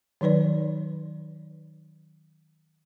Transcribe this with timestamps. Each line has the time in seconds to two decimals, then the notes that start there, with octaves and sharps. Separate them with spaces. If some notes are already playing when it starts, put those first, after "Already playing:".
0.21 D#3 F#3 D#4 B4 D5